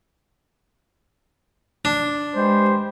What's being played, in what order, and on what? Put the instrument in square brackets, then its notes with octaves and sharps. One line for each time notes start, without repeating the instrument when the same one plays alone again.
[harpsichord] D4
[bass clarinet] G#3 [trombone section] G4 B4 C5